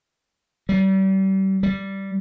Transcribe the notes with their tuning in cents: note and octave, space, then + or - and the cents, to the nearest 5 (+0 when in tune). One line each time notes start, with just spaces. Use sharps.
G3 -35
G3 -10